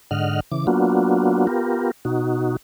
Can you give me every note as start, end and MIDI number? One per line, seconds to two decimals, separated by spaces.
0.11 0.40 44
0.11 0.40 50
0.11 0.40 75
0.11 0.40 78
0.11 0.40 89
0.52 0.66 49
0.52 0.66 52
0.52 0.66 86
0.67 1.47 54
0.67 1.47 58
0.67 1.47 59
0.67 1.47 62
0.67 1.47 65
0.67 1.47 66
1.47 1.91 59
1.47 1.91 65
1.47 1.91 67
1.47 1.91 70
2.05 2.57 47
2.05 2.57 63
2.05 2.57 66